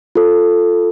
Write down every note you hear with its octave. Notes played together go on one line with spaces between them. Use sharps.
F4 A4